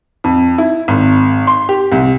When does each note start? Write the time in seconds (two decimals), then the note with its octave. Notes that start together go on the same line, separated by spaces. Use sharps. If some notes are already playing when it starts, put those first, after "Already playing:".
0.24 F2
0.58 E4
0.88 G#1
1.47 C6
1.69 G4
1.92 C2